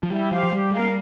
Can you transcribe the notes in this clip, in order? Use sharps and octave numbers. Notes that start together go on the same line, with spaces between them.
F3
G3 E4
F3 G4 C5 F5
F3
G3 G4
G#3 A#4 F5
A#3